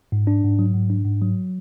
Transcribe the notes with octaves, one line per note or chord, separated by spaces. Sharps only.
G#2
D4
G#2
F#3
G#2
D4
G#2
F#3